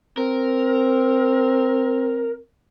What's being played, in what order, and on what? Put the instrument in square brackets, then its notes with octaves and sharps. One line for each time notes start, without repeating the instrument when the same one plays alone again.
[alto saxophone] C4 [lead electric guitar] A#4